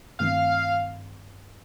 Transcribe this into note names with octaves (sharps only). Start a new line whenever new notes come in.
G2 D#3 A3 C4 F5